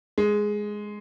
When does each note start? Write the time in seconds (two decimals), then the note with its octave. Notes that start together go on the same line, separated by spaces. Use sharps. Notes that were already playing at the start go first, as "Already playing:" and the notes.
0.18 G#3